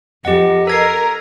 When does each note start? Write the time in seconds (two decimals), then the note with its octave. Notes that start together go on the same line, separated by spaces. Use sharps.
0.25 F2 G4 D#5 F#5
0.67 A4 A#4 G#6 C7